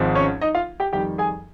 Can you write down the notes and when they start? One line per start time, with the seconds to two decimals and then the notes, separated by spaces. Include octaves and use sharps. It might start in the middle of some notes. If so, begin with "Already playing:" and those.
Already playing: G#1 G#2 F3 C4 D#4
0.15 C#4 C#5
0.41 D#4 D#5
0.55 F4 F5
0.80 G4 G5
0.93 F2 D#3 G3 G4 G5
1.18 G#4 G#5